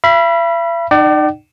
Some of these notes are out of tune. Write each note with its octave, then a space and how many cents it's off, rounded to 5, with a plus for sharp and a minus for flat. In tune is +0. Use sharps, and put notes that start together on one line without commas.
E5 +45 B5 -15
D#4 -35 D5 +20 G5 -45